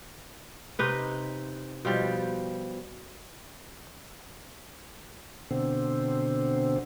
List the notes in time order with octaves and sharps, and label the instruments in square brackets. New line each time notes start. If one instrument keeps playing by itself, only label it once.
[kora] C3 D#4 B4
B2 F3 G3
[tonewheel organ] B2 D3 C4